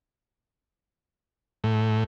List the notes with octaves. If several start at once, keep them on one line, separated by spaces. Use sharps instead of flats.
A2